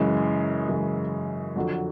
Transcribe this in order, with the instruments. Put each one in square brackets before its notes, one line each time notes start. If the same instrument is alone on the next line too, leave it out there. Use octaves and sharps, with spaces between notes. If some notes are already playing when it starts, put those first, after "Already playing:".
Already playing: [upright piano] F#2 C#3 E3 G#3
F#2 C#3 E3 G#3
F2 D3 F#3